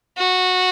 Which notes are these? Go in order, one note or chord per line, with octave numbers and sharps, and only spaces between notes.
F#4